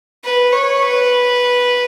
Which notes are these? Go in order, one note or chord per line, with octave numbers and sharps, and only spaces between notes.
B4
C#5
B4